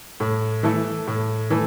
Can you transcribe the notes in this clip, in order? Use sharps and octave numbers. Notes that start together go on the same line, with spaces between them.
A2
E3 A3 E4 A4
A2
E3 A3